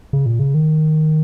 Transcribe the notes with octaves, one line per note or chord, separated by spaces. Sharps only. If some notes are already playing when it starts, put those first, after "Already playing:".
C#3
A#2
C#3
D#3